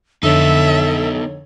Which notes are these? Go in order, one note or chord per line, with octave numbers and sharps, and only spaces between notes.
F2 D3 B3 D#4 A4 C#5 E5